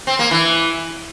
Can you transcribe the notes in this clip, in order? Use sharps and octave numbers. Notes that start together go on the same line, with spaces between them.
C4
A#3
E3